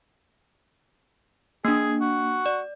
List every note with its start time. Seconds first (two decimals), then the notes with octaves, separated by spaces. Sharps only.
1.65 A#3 D4 G#4
2.01 F#4
2.46 D5